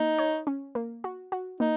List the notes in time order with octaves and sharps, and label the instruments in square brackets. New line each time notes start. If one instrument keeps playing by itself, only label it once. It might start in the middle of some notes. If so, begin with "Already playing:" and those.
Already playing: [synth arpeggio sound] A#3 [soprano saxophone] D#4
[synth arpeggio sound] C#5
C#4
A#3
F#4
F#4
[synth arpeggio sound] A#3 [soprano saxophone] D#4